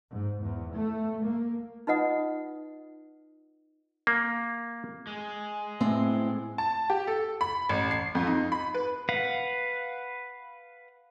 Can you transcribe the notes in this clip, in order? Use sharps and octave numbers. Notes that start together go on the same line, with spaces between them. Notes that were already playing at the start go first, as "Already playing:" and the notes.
G#2
E2
A3
A#3
D#4 F4 B4 D#5 F#5 D#6
A#3
G#3
A2 C4
A5
G4
A4
B5
A1
C7
F2
D#4
B5
B4
B4 F5 F#5